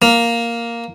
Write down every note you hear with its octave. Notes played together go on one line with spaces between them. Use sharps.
A#3